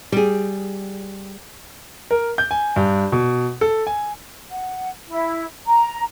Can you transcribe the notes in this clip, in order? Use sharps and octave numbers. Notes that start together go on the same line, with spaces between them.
G3 G#4
A#4
G6
G#5
G2
B2
A4
G#5
F#5
E4
A#5